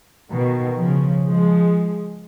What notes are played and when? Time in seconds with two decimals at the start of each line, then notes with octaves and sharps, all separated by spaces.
0.31 B2 D#3
0.78 C#3 F3
1.26 F3 G#3